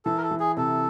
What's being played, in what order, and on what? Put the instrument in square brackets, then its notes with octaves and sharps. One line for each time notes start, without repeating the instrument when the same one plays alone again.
[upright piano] E3 [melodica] A4
[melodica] A#4
A4
[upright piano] E3
[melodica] G#4
[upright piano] C3 [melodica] A4